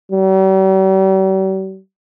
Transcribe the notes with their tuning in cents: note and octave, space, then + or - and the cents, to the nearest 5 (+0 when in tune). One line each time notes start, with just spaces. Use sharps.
G3 -45